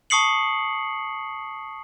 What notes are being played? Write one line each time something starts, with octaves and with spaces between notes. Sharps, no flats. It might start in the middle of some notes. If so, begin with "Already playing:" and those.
A5 C#6 D#6 C7 C#7 F#7